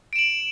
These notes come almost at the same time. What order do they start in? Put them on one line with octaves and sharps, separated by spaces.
D7 E7 F#7